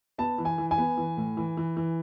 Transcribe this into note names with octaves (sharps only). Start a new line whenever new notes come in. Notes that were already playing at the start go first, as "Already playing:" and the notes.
B3 A5
E3
G#5
E3
G#5
B3
E3
A2
E3
E3
E3